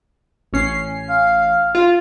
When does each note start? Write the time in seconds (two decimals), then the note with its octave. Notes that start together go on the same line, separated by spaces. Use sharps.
0.53 A1 C#4 C7
1.09 F5
1.75 F4